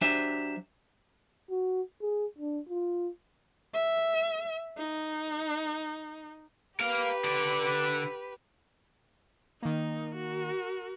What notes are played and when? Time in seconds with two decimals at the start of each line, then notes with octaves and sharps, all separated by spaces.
0.01 F#3 D4 G4 C5 E5
1.50 F#4
2.02 G#4
2.38 D4
2.69 F4
3.74 E5
4.77 D#4
6.80 G4 A#4 B4 F5
7.24 D3 D5
9.62 D#3 A#3 D#4
10.16 F#4 A#4